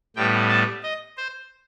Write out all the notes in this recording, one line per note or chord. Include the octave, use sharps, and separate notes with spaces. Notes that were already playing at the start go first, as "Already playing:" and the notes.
A2 G3 B3 G5
A5
D#5
C5